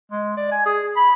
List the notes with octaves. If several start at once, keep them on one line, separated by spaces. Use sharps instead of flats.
G#3
D5
G#5
G#4
B5